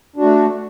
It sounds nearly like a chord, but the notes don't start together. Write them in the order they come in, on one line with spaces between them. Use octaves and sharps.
D4 F#4 A3